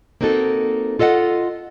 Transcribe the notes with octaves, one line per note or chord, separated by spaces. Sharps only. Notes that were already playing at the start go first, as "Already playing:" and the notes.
A#3 C4 D#4 F#4 A4
F4 A4 D#5 E5 F#5